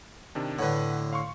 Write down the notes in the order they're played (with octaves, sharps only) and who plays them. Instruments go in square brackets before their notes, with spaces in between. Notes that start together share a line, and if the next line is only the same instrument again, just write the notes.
[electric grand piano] C3 D#3 D4
[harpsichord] A2 D3 [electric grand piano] B4 F#5
[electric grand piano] F5 C6 C#6